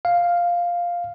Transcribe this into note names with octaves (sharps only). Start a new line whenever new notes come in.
F5